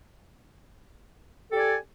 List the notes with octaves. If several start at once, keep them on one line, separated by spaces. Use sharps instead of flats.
G4 A4 D5 G#5